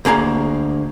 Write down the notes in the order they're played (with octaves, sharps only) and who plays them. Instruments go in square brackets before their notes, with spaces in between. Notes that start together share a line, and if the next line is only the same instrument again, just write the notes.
[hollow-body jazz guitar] D2 A#3 G#4 A#5